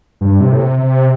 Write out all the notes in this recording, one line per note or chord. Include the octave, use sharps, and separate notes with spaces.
G2
C3
A2
C3
C3